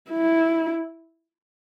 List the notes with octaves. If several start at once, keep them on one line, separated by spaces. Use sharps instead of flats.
E4